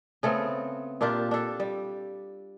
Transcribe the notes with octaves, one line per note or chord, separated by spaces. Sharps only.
C#3 A3 B3 C4
A#2 D4 F4 G4
D4 A4
G3